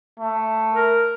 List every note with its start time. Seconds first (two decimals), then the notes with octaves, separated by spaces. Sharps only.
0.20 A3
0.73 A#4